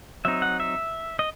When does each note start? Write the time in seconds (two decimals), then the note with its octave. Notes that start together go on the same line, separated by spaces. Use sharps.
0.25 F#3 C4 D#4 E5
0.42 F#5
0.60 E5
1.19 D#5